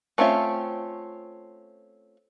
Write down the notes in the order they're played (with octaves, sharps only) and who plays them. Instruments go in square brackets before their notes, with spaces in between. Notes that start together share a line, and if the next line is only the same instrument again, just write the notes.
[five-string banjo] A3 C4 C#4 F4 E5